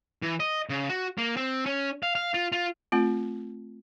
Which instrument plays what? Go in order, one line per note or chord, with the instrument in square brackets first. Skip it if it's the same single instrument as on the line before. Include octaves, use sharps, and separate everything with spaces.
[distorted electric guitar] E3
D#5
C#3
F#4
A#3
C4
C#4
F5
F5
F4
F4
[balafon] A3 C4 F4